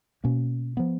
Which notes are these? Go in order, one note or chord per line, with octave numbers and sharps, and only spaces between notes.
B2 A#3 C#4
F3 B3